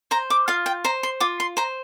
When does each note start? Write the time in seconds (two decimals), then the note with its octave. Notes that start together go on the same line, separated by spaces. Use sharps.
0.11 C5 A#5
0.30 D6
0.48 F4 F5
0.66 G5
0.84 C5 A#5
1.03 C6
1.20 F4 D6
1.40 C6
1.57 C5 A#5